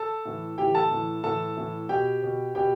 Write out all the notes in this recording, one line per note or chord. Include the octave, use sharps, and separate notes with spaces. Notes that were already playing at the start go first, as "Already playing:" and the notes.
Already playing: A4 A5
A2 E3
A2 E3 G4 G5
A4 A5
A2 E3
A2 E3 A4 A5
A2 E3
B2 G4 G5
B2
B2 G4 G5